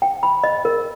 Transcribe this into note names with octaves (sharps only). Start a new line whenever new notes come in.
G5
B5
D#5
A#4